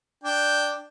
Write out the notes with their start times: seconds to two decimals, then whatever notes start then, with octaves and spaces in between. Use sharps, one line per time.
0.24 D4 G5